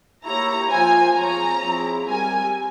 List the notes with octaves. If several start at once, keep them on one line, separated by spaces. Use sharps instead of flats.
A#3 E4 G4 C#5 A#5
F3 A#3 F4 C5 G#5
F3 C4 F4 G#4 C#5 A#5
F3 C4 E4 G#4
G3 C4 G4 A#4 G#5